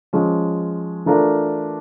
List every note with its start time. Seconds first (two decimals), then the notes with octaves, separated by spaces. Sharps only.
0.13 F3 G#3 C#4
1.06 E3 A3 D4 F4 A#4